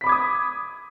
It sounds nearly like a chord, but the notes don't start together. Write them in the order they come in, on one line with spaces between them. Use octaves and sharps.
B6 B5 D6 G#6 D#6